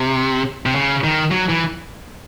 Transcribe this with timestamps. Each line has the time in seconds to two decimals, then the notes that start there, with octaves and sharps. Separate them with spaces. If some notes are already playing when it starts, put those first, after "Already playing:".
Already playing: C3
0.66 C3
0.76 C#3
1.04 D#3
1.31 F#3
1.49 E3